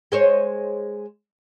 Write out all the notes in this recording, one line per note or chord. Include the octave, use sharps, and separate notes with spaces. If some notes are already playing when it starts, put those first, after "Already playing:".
G#3 C5 C#5